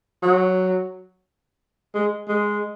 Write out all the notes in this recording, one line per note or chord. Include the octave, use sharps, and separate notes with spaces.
F#3
G#3
G#3